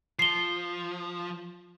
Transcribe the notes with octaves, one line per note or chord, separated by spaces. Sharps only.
F3 C7 G7